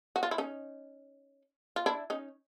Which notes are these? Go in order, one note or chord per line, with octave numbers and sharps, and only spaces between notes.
F#4
F4
E4
C#4 D#4
F4
D4 E4
C#4 D#4